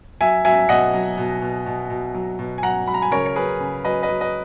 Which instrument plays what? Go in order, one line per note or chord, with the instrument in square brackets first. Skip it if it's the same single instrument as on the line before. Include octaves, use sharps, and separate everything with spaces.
[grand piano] F#3 E5 G#5
F#3 E5 G#5
B2 D#5 F#5
F#3
B2
B2
B2
B2
F#3
B2
G#5
F#3 F#5 A#5
F#3 B5
A#5
G#5 B5
C#3 A#4 C#5
C#5
F#3 G#4 B4
C#3
F#3 B4 D#5
B4 D#5
F#3
B4 D#5